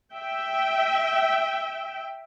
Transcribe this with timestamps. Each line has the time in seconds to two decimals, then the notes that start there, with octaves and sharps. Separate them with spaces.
0.14 E5 G5